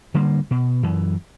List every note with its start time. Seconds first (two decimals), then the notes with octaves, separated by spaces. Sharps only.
0.14 D3 G3 A#3
0.51 B2
0.83 F#2 E3